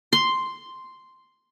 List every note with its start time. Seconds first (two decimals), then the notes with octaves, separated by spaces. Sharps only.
0.13 C6